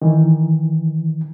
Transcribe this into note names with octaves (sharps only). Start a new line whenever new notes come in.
D#3 E3